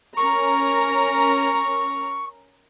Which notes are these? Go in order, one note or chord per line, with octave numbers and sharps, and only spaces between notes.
C#4 A#4 A#5 C#6